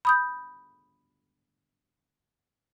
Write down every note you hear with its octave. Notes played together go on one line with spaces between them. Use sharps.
B5 D#6 G6